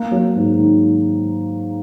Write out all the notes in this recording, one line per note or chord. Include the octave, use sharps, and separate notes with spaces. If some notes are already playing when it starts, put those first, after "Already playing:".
Already playing: A#3
F#3
G#2
D#3